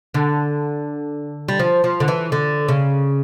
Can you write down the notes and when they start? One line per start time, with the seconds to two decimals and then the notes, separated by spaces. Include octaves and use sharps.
0.14 D3
1.48 G3
1.59 F3
1.84 F3
2.00 D3
2.08 E3
2.32 D3
2.68 C#3